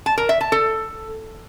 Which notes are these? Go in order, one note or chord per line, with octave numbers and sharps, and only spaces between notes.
A5
A#4
E5
A5
A4